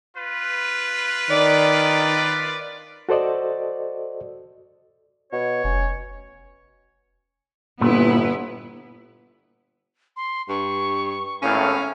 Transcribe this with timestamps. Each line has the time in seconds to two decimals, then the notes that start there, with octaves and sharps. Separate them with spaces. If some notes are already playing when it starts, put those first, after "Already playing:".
0.17 F4 B4
1.30 D#3 D5
3.09 F#4 A4 C5 D5 D#5
5.32 B2 C#5
5.64 F1 C#4
7.81 G1 A#2 B3 E4 B4
10.16 C6
10.49 G2 C#6
11.42 G#1 A2 C#4 F5